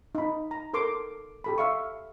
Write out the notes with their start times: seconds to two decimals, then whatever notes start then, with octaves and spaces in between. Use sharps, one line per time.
0.15 D#4 B5
0.51 A#5
0.73 A4 A#4 C6 D6
1.44 G4 A4 B5
1.58 E5 F5 C#6